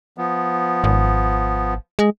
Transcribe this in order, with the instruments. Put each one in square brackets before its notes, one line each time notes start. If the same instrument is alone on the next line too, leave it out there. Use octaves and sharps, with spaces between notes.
[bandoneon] F3 B3
[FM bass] G#1
G#3